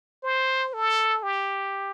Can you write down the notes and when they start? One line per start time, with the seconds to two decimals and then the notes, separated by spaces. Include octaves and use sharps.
0.24 C5
0.73 A4
1.23 G4